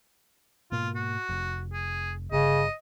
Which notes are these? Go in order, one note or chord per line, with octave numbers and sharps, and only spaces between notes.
G#2 B2 A#3 F4
F#4
F1
G#4
G1 C#3 D#5